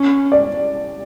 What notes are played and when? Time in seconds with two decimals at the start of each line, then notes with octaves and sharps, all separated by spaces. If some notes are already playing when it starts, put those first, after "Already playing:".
Already playing: C#4
0.32 D5